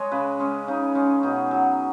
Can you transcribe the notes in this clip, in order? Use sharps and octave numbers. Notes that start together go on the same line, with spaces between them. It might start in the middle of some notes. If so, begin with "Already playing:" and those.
Already playing: G#3 C#5 D#5
C#3 B4
G#3 C#4
C#3 D#4
G#3 C#4
B2 D#4
F#3